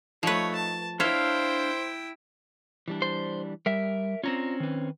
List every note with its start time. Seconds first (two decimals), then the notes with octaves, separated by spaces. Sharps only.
0.23 F3 A3 D#4 B4 C#5
0.55 A5
1.00 D4 E4 C5 C#5 E5 F5 G5
2.88 E3 G3 D4
3.02 C5
3.66 G3 A#4 E5
4.24 C4 C#4 F4 D5 A#5
4.60 D#3 B4